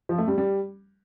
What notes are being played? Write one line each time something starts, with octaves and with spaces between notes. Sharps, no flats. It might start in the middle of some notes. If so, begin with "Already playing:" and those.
F3
A3
G3
G3